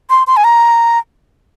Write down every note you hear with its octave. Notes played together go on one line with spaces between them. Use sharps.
C6
C6
G#5
A#5